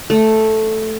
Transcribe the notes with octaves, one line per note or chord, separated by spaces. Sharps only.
A3